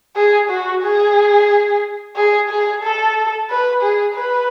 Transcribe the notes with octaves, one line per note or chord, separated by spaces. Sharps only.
G#4
F#4
G#4
G#4
G#4
A4
B4
G#4
B4